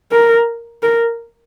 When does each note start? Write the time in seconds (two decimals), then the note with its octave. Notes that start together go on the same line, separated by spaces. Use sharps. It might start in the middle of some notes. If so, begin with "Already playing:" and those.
0.12 A#4
0.83 A#4